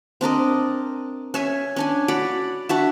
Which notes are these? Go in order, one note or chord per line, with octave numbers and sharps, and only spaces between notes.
C4 D4 A#4 D#5
C#4 E5 G#5
C#4 D4 G#5
F#4 C#5 D5 B5
D4 F#4 E5